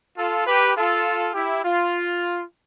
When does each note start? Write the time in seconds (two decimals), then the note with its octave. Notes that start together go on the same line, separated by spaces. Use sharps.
0.17 F4 A4
0.46 G4 B4
0.76 F4 A4
1.34 E4 G4
1.64 F4